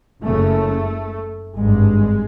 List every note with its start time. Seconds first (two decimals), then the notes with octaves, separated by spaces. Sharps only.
0.24 F#1 F#2 C#3 A3
1.56 G#1 G2 G#3